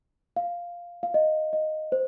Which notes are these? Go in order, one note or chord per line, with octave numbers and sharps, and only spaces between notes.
F5
F5
D#5
D#5
C5